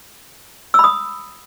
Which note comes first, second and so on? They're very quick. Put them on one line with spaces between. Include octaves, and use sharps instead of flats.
E6 B5 D#6